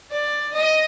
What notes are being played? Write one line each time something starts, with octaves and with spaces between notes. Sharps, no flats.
D5
D#5